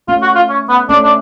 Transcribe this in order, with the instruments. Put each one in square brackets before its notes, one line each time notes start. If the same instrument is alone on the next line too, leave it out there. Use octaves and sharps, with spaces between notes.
[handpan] A3 C#4 [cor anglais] F4
[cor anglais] F#4
F4
C#4
B3
[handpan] A3 C#4 [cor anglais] D4
[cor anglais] D4